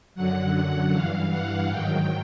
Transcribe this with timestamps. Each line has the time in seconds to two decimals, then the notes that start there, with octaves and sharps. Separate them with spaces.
0.15 F#2 D3 F#3 F#5
0.54 F#5
0.92 G2 E3 F5
1.31 F#5
1.69 G#2 D#3 F#3 G5